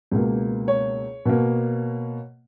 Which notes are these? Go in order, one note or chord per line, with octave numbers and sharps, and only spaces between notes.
C#2 B2 A#3
C#5
B2 A#3